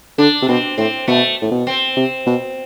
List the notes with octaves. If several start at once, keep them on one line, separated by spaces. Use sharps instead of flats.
D3 D4
C3
B2 C4
A2 C4
B2 A3
A2
B2
C4
C3
B2